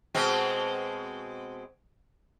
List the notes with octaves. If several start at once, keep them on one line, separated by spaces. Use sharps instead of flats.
B2 G#3 C4